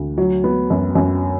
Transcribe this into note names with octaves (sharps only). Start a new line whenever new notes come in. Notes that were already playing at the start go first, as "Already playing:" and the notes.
Already playing: D2
F#3
B3
F#2
F#2